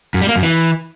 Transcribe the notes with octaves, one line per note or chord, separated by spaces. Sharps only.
F#2
G3
A#3
F#2
E3